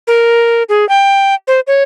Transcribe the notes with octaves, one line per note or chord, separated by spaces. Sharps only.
A#4
G#4
G5
C5
C#5